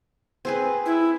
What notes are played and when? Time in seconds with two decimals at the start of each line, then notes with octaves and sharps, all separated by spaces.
0.45 C4 G#4 B4
0.86 E4